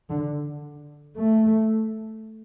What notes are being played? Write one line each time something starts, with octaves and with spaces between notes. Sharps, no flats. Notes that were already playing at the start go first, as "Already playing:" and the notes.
D3
A3